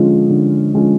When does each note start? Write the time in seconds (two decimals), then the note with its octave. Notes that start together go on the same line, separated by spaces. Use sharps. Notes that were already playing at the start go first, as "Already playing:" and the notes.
Already playing: D3 F3 G#3 C#4 F4
0.30 D3
0.74 F3 G#3 C#4 F4